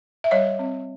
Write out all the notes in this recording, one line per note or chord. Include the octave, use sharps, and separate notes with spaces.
E5
G3 C#5 D#5
C4